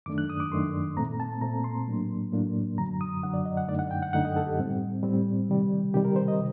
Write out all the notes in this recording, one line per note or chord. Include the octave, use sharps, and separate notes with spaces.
F#2 D#3 A3 D4 D6
F#6
D#6
D6
F#2 D#3 A3 D4 C6
A#2 A3 C4 A#5
A5
A#2 A3 C4 A#5
C6
A2 F#3 A#3 D4
A2 F#3 A#3 D4
F#2 D3 F#3 A#5
D#6
F#2 D3 F#3 F#5
D5
D#5
F#5
F#2 D3 A3 D#4 D5
F#5
G5
F#5
F#2 D3 A3 D#4 F#5
D#5
A4
G4
A2 G3 C4
A2 G3 C4
C3 D#3 G3
C3 D#3 G3 G4
A#4
C5
D#5